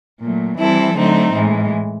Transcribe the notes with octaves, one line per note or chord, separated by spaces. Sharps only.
A#2 F#3 A3
E3 G3 C4 E4 A4
D3 F#3 A3 C4 D#4
A2 E3 G#3